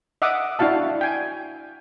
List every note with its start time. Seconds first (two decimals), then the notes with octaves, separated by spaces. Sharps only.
0.22 D#5 E5 F#5 D6 D#6
0.59 D4 E4 F#4 F5 A5
1.01 G5 G#5